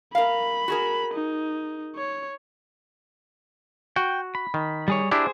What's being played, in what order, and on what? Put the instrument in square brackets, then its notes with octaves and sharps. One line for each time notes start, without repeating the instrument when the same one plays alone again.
[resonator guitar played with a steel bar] A#4 F5 [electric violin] B5
[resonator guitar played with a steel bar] F#4 G#4 A#4
[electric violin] D#4
C#5
[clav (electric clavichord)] F#4 [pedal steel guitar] G5
[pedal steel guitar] B5
[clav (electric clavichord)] D#3
[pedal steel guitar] G3 G#4 C#5
[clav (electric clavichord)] D4 E4 G4 [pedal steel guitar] G#4 C5